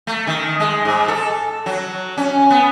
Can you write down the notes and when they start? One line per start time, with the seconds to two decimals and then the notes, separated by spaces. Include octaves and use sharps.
0.07 A3
0.27 D#3
0.60 G#3
0.85 G#2
1.08 A4
1.66 F#3
2.17 C#4
2.50 B3